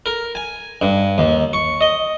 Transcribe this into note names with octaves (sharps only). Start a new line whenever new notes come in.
A#4
G#5
G2
D#2
C#6
D#5